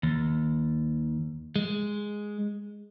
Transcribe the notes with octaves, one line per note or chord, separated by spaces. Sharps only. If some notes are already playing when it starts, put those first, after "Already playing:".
D#2
G#3